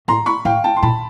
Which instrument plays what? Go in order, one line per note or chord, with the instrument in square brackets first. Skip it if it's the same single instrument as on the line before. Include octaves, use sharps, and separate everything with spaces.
[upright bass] A2 [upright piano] A#5 C6
[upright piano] B5 C#6
[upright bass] A2 [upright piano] F5 G5
[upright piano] G5 A5
C6
[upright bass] A#2 [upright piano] A5 B5